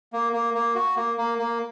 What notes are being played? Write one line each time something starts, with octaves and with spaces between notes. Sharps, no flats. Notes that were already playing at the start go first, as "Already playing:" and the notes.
A#3
A#3
A#3
F#4
A#3
A#3
A#3